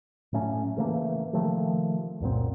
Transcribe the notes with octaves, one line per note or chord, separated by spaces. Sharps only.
A2 F#3 A3 C#4
C#3 E3 A3 A#3
C3 D#3 F3 A3
C#2 F#2 A#2 C4